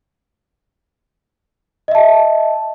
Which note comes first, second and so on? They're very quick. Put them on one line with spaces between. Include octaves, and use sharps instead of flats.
D#5 E5 A5